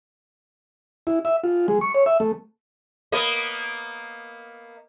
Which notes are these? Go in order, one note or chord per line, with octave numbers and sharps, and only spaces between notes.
E4
E5
F4
G#3
C#6
C#5
E5
A3
A#3 B3 D#5